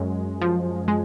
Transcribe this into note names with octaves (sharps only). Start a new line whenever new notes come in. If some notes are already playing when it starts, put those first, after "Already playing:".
Already playing: F#2 G#3
F3
G#3